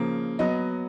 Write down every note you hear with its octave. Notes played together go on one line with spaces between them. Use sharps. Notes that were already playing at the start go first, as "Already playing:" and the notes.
Already playing: C#3 F3 A#3
F#3 B3 D#5